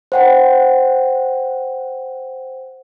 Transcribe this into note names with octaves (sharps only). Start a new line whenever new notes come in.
C5 F#5 G5